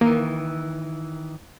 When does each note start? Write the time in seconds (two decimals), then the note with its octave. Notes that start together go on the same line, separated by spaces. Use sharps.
0.01 D#3 E3 A#3